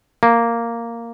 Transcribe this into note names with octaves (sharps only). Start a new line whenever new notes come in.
A#3